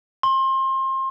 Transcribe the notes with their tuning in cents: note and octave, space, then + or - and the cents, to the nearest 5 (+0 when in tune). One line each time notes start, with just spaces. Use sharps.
C6 +30